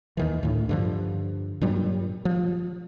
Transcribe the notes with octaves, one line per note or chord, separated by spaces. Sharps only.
D#2 D#3 E3
D2 A2
G2 D3 F3
G2 A#2 F#3 G3
F3